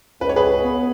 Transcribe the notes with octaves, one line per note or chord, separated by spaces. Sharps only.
C#2 B4
C#5
G#4 B4
B3